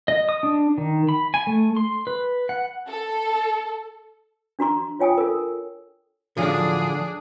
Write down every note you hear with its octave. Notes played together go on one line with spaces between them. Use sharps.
D#5
D#6
D4
D#3
B5
G#5
A3
C6
B4
F#5
A4
D4 F#4 A#5 C6
F4 C#5 G5 G#5 D#6
A4 A#4
A2 D3 F3 F#3 D4 G#4